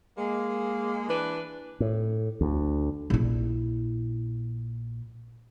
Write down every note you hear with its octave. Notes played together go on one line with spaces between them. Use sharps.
G#3 A#3
E3 D4 B4
A2
D2
A#1 E4